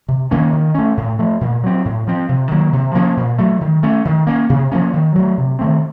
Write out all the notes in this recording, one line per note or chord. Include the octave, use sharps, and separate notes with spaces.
C3
D#3 A#3 C#4
D#3
A3 C#4
A2
F3 A3
A#2
F#3 C4
A2
F3 C4
C3
D#3 F#3 A#3
C3
F3 A#3 C#4
A#2
F#3 A3
D#3
A3 C#4
D#3
A#3 C#4
C3
F3 A#3 C#4
D#3
F#3 A3
C3
D#3 A3 C4